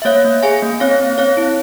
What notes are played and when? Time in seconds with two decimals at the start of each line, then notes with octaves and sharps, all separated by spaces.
0.02 E5
0.05 A#3 C#5 F5
0.24 A#3
0.43 G#4 F5 G#5
0.62 A#3
0.80 C4 C#5 F5
1.00 C4
1.18 C4 C#5 F5
1.37 E4